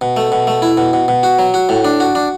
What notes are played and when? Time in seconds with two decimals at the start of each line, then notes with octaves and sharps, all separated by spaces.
0.01 B2
0.17 A3
0.32 B2
0.47 A3
0.62 E4
0.77 B2
0.93 B2
1.08 B2
1.23 F#4
1.39 F#3
1.54 F#4
1.69 A2
1.85 D4
2.00 F#4
2.15 D4